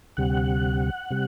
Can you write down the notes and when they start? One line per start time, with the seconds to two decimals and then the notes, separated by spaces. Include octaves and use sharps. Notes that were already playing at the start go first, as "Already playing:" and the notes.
0.17 D2 C3 G3 F#5
1.10 C3 G3